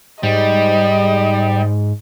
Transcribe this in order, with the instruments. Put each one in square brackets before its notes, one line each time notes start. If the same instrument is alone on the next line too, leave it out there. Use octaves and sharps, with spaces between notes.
[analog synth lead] G#2 [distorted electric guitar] G3 [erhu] D#5